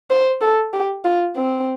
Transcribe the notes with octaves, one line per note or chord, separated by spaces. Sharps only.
C5
A4
G4
F4
C4